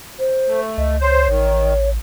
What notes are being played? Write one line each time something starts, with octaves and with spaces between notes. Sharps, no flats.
C5
A3
C#2 D#5
C5 C#5
A1 D#3